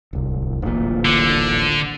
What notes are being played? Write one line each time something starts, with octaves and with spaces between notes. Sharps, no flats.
D1 C2
D1 A1 A#2
D3